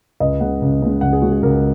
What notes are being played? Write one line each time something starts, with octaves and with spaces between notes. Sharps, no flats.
C#2 D#5
C#3 G#3 F#5
C#2
C#3 G#3
C#2 F#5
G#4
C#3 G#3 F#4
G#4
C#2 A#4